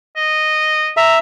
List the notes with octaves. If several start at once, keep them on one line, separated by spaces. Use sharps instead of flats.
D#5
E5 A#5